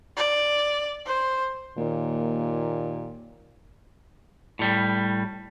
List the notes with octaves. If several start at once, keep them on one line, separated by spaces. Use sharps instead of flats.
D5
C5
D#2 A#2
A2 G3